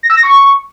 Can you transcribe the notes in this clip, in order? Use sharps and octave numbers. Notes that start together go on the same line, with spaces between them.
A#6
E6
A#6
C#6